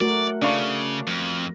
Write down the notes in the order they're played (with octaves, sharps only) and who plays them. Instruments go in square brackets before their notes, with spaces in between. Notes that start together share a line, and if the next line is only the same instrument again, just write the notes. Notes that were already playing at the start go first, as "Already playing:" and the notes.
[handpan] A3 F#4 A#4 [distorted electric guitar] D5
[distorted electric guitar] C#3 [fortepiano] D4 F5 C#6
[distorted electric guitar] F2